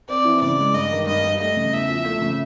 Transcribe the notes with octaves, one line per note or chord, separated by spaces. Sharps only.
C4 D5
E3
C#3 D5
G#3
G2 D#5
D#3
G2 D#5
G3
A3 D#5
C#3
E2 E5
F3
A3
C#3